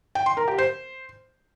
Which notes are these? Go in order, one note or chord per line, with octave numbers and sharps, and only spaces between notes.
G5
C6
A#4
G4
C5